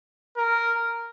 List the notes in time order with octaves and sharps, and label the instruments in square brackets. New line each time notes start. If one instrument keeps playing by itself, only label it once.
[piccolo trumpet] A#4